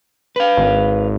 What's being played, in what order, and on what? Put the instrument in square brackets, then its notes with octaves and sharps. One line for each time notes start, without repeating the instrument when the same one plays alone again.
[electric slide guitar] B4 F5
[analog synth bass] G#1